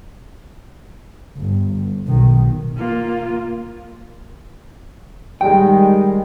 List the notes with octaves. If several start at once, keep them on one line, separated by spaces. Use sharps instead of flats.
G1
B1 D#3
A#3 F4
D#3 G3 G#3 G5